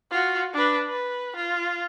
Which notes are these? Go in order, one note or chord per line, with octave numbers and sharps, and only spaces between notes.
F4 F#4
D4 B4
B4
F4